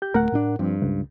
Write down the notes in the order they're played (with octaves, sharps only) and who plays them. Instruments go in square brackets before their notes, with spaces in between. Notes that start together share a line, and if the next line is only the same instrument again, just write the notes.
[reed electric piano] G4 G6
[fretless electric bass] D1 A3 [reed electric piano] A#4 F#5
[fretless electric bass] A2 C#4 D4
[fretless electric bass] G2 [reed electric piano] F3 C4
[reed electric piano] C#2